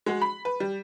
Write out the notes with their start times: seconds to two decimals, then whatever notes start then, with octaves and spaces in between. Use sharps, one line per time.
0.06 G#3 F#4
0.22 B5
0.45 B4
0.60 G3